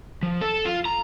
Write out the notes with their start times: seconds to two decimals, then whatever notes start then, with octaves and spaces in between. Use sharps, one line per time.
0.23 F3
0.41 A4
0.65 F4
0.86 A#5